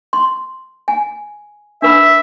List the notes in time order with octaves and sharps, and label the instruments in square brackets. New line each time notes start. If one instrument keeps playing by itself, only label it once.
[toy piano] C6
G#5
[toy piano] D4 B4 B5 [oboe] E5